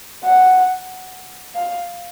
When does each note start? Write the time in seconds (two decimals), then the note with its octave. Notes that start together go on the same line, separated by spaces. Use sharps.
0.24 F#5
1.55 F5